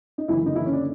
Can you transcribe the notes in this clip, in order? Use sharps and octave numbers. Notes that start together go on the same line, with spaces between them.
D#4
F#1 F#2 D3 E3 E4
D#4
E3 E4
C#4
D4